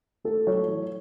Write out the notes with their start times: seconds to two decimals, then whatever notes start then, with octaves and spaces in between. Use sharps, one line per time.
0.24 A3 A4
0.47 F#3 C#5
0.68 E3